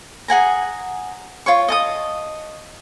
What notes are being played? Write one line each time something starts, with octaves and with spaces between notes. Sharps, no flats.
G#4 F#5 G#5 A#5
F4 C#5 C#6
D#5 A5 D#6